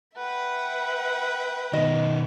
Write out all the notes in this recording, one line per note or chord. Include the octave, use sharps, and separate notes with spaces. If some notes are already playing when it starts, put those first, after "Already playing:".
B4 E5 F#5 G5
B2 D#3 D#5